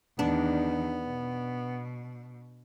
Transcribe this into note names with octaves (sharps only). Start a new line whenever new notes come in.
E2 D#3 B3 D4
B2